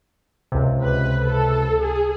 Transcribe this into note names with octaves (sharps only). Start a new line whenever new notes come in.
C#2 C3
B4
A4
G#4